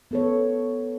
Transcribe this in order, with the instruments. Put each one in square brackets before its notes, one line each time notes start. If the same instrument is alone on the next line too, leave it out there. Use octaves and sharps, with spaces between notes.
[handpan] B3 A4 C#5